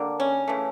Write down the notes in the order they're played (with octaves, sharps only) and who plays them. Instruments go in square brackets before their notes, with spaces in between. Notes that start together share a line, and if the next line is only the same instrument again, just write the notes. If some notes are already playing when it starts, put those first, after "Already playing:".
Already playing: [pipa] D3 G3 A#3
C#4
C#3 E3 A3